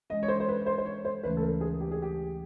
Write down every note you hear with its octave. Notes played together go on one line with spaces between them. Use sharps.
E3 G#3 C#4 D#5
C#5
C5
C5
B4
C5
C5
C#5
C5
D2 C#3 E3 A3 C#4 B4
A4
A#4
G#4
G4
G#4
G4